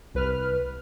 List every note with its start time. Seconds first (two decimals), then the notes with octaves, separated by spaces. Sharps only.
0.14 C2 B4 F6